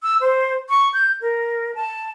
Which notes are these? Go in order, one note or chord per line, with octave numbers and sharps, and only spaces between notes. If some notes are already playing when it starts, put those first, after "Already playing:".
E6
C5
C#6
G6
A#4
A5